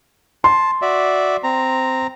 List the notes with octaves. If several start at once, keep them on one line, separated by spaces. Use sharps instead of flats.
A5 C6
F#4 D5 E5
C4 A#5